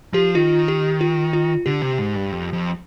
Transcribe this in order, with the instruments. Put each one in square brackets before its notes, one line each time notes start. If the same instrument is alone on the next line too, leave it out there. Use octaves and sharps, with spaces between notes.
[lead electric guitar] F3 [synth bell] G4
[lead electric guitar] D#3 [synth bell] F4
[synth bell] G4
F4
F4
[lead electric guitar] D3 [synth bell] G4
[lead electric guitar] C3
G#2
G2
F2
F2